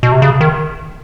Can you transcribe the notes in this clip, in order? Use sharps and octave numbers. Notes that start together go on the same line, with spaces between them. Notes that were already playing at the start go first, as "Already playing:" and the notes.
B2
C3
C#3
D#3